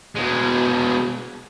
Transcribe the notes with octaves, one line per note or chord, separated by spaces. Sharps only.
B2 G#3